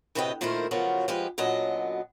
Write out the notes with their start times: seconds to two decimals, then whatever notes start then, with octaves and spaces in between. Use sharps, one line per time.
0.15 D2 A2 C3 B4 D#5 G5
0.41 A#2 D#3 A3 E4 A#4 C5
0.71 C#3 F3 F#3 B3 F#4 A#4
1.08 F3 G#3 G4 B4
1.38 F#2 A#2 D3 F#3 B3 D#5